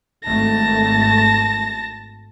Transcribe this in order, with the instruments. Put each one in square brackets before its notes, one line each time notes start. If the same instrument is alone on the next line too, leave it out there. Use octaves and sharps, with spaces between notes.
[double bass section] G#1 A3 [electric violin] A5 A#6